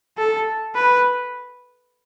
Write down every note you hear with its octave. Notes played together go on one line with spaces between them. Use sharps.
A4
B4